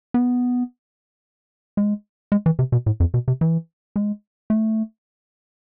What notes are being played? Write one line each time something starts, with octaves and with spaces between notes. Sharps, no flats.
B3
G#3
G#3
E3
C3
B2
A2
F2
B2
C3
E3
G#3
A3